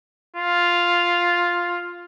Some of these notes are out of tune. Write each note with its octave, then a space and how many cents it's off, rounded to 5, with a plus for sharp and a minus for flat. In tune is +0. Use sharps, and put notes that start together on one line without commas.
F4 +0